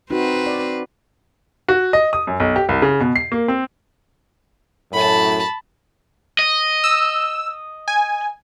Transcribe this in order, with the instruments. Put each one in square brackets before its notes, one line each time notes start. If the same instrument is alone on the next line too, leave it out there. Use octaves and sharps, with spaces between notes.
[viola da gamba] C4 B4 [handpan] D#4 F#4
[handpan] D5
[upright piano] F#4
D#5
D#6
F#2
B1
G4
C2
C#3
B2
C7
A#3
C4
[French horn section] F#2 A2 [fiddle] A5 B5
[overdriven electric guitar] D#5
[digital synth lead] E6
G#5